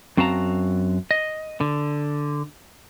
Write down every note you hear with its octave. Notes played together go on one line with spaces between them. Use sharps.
F#2 C4 F#4 F5 A5 A#5
D#5
D3